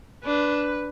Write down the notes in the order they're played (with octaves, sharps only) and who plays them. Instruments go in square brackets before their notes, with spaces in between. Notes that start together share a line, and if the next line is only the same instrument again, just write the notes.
[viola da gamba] D4 [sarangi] B4